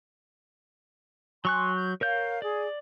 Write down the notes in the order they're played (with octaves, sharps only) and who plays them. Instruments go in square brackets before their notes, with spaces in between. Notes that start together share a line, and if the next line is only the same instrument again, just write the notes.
[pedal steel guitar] F#3 C#6 F#6 [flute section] G#5 C6
[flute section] G6
[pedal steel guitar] A#4 C#5 G6 [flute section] F5
[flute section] G#4 [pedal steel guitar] D5